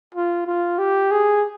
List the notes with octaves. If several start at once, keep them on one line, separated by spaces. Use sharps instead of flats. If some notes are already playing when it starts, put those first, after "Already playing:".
F4
F4
G4
G#4